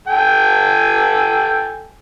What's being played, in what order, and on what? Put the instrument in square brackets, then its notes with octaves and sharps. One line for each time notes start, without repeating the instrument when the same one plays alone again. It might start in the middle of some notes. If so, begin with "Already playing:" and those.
[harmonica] A4 G5 G#5